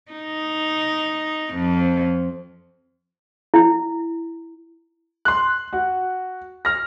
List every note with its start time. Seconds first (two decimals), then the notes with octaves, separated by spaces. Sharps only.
0.12 D#4
1.53 F2
3.54 E4
5.25 C6 F#6
5.73 F#4
6.65 F6 A#6